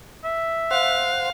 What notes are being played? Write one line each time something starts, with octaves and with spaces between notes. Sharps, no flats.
E5
C5 F5 F#5